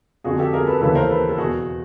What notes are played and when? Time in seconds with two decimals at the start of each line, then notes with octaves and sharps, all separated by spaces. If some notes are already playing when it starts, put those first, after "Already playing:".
0.24 F2 D3 F#4 G#4
0.39 G4 A4
0.53 G#4 A#4
0.67 A4 B4
0.81 D#2 C#3 E3 A4 B4
0.95 A#4 C5
1.10 A4 B4
1.29 A4
1.38 E2 B2 F#4 G#4